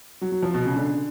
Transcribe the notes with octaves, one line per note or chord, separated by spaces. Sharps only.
F#3
F#3
F3
B2
C#3
D3
D3